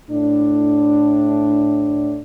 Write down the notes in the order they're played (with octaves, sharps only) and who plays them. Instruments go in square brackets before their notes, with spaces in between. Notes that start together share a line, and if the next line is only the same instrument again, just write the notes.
[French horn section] A2 D4